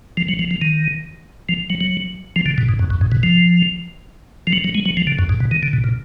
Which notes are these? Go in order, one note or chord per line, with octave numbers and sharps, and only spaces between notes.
F3
F#3
F3
F3
D#3
F3
F#3
F#3
F3
D3
B2
G#2
F#2
F#2
G#2
B2
F3
F3
F#3
F#3
G#3
F#3
F3
D3
F#2
G#2
B2
D#3
D3
B2
A#2